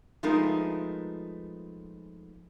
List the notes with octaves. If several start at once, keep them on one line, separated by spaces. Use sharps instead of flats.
F3 G#3 A3 B3 D#4 A#4